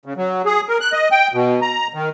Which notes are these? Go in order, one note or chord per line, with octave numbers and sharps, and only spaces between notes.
C#3
F#3
G#4
A#4
F#6
D#5
G5
B2
A#5
D#3